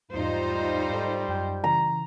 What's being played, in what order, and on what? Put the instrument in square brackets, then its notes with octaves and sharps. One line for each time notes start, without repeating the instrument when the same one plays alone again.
[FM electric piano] E2 G#2 [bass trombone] G3 [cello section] D#4 F4 C5
[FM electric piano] G#2 A4
F#2 G5 G6
[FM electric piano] C#3 E3 [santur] A#5